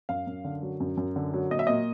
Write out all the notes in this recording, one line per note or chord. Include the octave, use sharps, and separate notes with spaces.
F#2 F5
F#2
D3
F#3
F#2
F#2
D3
F#3
A#2 D#5
E5
A#2 D#5